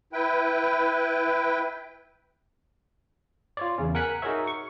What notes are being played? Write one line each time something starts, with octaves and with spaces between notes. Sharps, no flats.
E4 B4 G5
F4 C#5 D5
E2 C#3 C#4
A#4 F#5 G#5 F#6 B6
D#4 F#4 G#4 A#4 C#5 E5
C#6